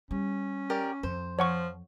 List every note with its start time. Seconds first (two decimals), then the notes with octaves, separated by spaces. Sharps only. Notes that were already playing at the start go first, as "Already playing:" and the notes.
0.11 G3 C#4
0.70 G4 A#4 D5
1.03 F2 C5
1.39 F3 C#5 F#5 C#6